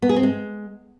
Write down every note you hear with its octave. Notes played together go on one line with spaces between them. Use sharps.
B3
G#4
C4
G#3